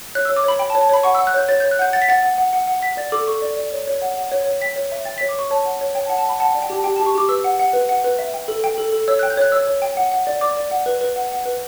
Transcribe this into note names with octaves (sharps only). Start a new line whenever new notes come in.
C#5 F#6
C#5 E6
D6
C#5 B5
G5 B5
A5
C#5
A5
C#5 B5
F#5 C#6
F#5 E6
F#6
C#5 G6
C#5 A6
C#5 G6
F#6
F#5 G6
F#5 A6
B6
F#5 A6
F#5
F#5
F#5
F#5
F#5 B6
D5 A6
A4 D6
A4 C#6
D5
D5
C#5
C#5
F#5
F#5
C#5
C#5
G5 B6
C#5
E5
G5 A6
C#5 B6
D6
C#5 C#6
C#5 A5
F#5
C#5
C#5 G5
A5
F#5
A5
F#5 B5
F#5 A5
G5
D5
G5
G4 A5
G4 G5
G4 A5
C#6
G4 D6
B4 E6
F#5
F#5
B4
F#5
B4
E5
G5
A4
G5
A4
A4
C#5 E6
G5 F#6
G6
C#5 F#6
C#5 E6
C#5
G5
F#5
F#5
D5
D5 D6
D5
F#5
B4
B4
F#5
F#5
B4